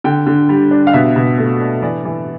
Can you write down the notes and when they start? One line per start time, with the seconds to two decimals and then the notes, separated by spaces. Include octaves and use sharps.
0.04 D3 G5
0.27 D3
0.49 G3
0.71 D4
0.87 F5
0.93 B2 E5
1.16 B2
1.38 A3
1.60 D4
1.82 E3 D5
2.05 E3